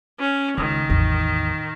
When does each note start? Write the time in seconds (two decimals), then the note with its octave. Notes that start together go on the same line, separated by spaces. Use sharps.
0.20 C#4
0.58 C#2 D#3
0.89 A1 E2